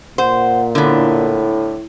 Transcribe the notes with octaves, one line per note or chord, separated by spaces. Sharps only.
A#2 C5 F#5
A2 D3 B3 E4